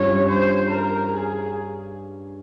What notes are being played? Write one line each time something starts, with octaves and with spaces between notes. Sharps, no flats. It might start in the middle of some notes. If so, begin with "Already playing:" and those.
Already playing: G2 G3 C#4 F4 C#5
C5
A#4
G#4